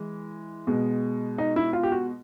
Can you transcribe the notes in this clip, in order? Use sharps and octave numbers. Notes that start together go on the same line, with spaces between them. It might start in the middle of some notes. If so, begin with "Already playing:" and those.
Already playing: E3 G#3
B2 G#3
D#4
E4
F4
G4
F#4